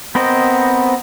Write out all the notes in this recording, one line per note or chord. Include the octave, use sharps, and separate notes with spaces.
B3 C4 A#4 C5 D#5